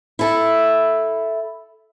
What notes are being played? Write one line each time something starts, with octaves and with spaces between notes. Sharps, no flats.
E4 A4